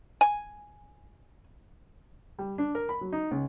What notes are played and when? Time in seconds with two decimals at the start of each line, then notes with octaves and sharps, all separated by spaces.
0.21 G#5
2.39 G3
2.58 D4
2.75 A#4
2.89 B5
3.01 F#3
3.12 D#4
3.31 C#2